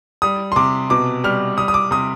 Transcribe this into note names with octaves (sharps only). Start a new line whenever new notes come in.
G3 D#6
C6
C3 D6
B2 D6
G3 F6
G3 D#6
D#6
D6
C3 D#6